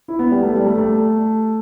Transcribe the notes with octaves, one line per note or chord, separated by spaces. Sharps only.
E4
B3
G3
A3
G3
A3
A3